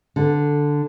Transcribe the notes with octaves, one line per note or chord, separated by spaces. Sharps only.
D3